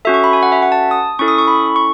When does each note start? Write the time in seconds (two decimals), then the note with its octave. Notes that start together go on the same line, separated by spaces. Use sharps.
0.05 C#4 F#4 A4 E5
0.14 C#6
0.24 B5
0.33 G#5
0.43 F#5
0.52 E5
0.62 F#5
0.72 A5
0.91 D#6
1.19 C#4 E4 A4 C#6
1.28 D#6
1.38 C#6
1.48 B5
1.76 C#6